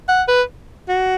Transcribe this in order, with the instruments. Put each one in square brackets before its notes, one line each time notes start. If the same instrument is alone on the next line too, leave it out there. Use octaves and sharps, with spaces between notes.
[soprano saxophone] F#5
B4
F#4